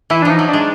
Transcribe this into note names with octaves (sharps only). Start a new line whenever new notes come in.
E3 E4
D4
F3 D#4
F#3
G#3 D4